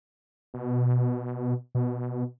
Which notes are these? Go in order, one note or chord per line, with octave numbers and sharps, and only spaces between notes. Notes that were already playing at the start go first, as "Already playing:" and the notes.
B2
B2